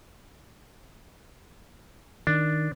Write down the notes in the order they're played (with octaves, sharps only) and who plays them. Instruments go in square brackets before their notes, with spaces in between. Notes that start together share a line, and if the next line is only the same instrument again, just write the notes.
[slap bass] D#3 [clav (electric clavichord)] D4